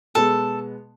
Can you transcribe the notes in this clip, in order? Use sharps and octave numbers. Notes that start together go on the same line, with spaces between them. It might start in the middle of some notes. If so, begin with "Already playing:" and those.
B2 G#3 B3 A4